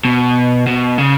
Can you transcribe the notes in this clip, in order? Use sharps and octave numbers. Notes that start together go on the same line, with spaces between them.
B2
B2
C#3